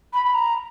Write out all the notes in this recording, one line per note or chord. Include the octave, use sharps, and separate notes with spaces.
B5
B5
A#5